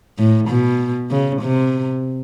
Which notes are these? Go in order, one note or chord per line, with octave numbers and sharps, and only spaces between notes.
A2
B2
C#3
C3